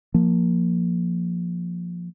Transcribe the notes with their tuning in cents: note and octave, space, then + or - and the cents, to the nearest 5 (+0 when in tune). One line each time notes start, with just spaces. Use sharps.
F3 +0 A#3 +0